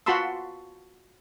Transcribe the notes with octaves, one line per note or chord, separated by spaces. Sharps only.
F4 F#4 A5 B5 C6 E6